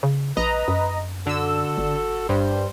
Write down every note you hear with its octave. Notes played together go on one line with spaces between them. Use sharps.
C#3
A#1 B4 D#5 A#5
F#2
D3 F#4 A4 E6
G1
G2 G3 C5